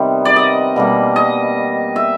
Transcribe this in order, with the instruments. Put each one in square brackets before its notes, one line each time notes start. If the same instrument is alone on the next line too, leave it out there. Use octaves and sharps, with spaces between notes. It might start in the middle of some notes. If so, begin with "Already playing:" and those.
Already playing: [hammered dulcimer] C3 D#3 G3 B3
D5
D#5
B2 G3 A#3
D#5
E5